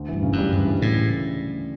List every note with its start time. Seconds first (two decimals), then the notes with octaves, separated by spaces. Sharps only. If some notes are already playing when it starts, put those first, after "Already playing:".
Already playing: D2
0.09 G2 E3
0.23 C#3
0.33 F#2
0.38 G3
0.52 D2 G2
0.67 E3
0.81 A2 C#3
0.96 G3